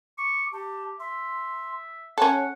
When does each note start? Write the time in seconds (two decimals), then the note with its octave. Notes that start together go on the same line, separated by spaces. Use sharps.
0.18 C#6 D6
0.53 G4 A5
1.00 E5 C6
2.18 C#4 A4 C#5 F#5